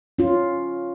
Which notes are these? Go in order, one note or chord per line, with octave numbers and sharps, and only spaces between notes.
C#4 F4